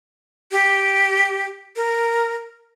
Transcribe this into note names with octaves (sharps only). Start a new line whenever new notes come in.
G4
A#4